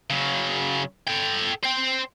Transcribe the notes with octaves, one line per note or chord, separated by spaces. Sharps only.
C#3 F#3
A4 G5
C5 G5